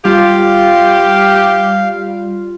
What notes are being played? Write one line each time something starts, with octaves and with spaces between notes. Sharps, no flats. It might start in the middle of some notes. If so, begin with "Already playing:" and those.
G3 F4 G4 F5